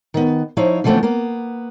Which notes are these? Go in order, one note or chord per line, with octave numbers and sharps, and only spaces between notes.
D#3 B3
F3 D#4 E4 C#5 F5
C#3 E3 F3 A3 B3 C4
A#3 B3